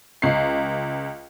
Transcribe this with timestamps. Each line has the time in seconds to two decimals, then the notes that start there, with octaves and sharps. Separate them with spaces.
0.22 C#2 C7